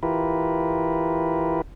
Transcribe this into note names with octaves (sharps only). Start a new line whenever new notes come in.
E3 E4 F4 G4 A#4 B4